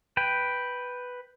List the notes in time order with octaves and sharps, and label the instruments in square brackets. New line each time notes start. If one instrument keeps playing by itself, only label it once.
[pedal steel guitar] B4 G5